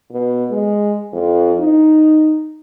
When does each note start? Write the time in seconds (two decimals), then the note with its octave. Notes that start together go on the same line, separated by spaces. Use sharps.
0.12 B2
0.50 G#3
1.13 F2
1.59 D#4